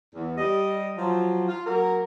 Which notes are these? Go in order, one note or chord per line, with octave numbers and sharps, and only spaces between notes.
E2
G3 D#5
F3 F#3
F4
F#3 A#3 A#4